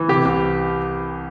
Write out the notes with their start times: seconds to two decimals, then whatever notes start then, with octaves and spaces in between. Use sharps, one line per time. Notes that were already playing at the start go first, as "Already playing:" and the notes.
Already playing: E3
0.08 C3 G4
0.25 C2